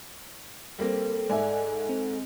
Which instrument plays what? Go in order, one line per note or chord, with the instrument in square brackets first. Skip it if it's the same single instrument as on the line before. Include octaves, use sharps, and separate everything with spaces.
[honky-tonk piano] G3 A#3 C4 [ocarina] A4
[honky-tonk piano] G#2 G#5 [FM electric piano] D5 E5
[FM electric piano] C4